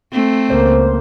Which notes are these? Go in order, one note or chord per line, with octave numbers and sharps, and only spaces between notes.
A3 C4
C#2 A#3 C5